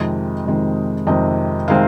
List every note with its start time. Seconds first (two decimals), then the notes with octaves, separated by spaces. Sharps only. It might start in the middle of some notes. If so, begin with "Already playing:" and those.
Already playing: F2 C3 D#3 G#3 C4 D#5
0.46 F2 C3 D#3 G#3 C4
1.07 F2 C3 D#3 G#3 C4 D#5
1.68 C3 D#3 G#3 C4 F5